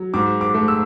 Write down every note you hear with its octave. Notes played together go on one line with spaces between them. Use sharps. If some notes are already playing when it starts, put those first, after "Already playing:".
Already playing: F#3
G#2 D6
D6
A3
E6